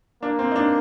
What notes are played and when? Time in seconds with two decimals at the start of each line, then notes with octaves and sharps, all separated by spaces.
0.23 A#3 D4
0.39 C4
0.51 D#4
0.56 D4